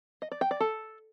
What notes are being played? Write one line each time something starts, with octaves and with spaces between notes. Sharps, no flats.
D#5
D5
G5
D5
A4